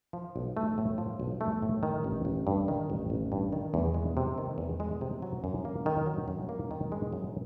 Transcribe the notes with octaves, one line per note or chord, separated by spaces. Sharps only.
F3
B1
A3
A2
F3
B1
A3
A2
D#3
A1
A1
G2
D#3
A1
A1
G2
D#3
E2
G#3
C3
D#3
E2
G#3
C3
F#3
F#2
A#3
D#3
F#3
F#2
A#3
D#3
G#3
F#2